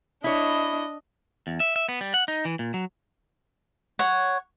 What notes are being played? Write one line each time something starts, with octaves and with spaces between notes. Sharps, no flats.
D4 E4 C#5 D#5
E2
E5
E5
B3
G3
F#5
D#4
E3
A#2
F#3
C#5 F#5